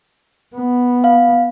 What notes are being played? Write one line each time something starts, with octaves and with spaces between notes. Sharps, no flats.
B3
F5